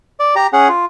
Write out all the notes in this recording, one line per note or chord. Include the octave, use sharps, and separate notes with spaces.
D5
G4 A#5
C#4 G#4 F#5
F4